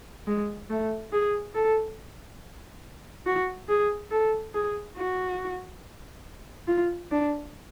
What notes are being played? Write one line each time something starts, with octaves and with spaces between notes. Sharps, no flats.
G#3
A3
G#4
A4
F#4
G#4
A4
G#4
F#4
F4
D4